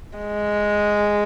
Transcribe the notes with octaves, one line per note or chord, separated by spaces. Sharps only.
G#3